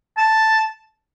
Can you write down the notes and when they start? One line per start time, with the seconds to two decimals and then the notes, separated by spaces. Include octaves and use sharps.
0.18 A5